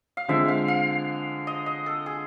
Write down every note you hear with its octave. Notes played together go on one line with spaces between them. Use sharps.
F5
D3 F3 G#3 C4 E5
F5
F5
D#5
D#5
A4
G#4